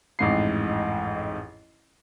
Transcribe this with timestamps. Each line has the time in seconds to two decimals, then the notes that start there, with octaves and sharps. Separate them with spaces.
0.19 A1 F2 G#2 D#5 C7